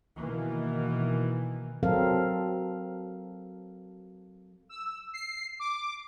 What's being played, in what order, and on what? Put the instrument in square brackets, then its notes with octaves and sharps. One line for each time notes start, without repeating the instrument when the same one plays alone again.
[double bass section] B2 D#3 E3 A#3
[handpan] F#3 C4 A4 A#4 F5
[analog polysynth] E6
C7
D6